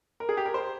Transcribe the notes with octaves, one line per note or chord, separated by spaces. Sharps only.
A#4
G#4
G4
A#4
C5